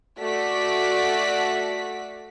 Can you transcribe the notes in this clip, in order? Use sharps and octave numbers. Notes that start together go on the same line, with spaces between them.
A3 F#4 D5 B6